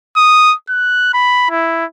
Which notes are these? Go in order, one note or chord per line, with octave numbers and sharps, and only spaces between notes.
D#6
F#6
B5
E4